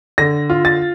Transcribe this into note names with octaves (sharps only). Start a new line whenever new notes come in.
D3 A#6
F4
A6